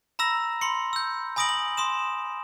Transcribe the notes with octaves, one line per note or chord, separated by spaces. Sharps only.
A#5 B5 E6 A#6
B5 C6 C#7
E6 G6
G#5 B5 D#6 A#6 D7 F#7
F#7
C6 D#6 E7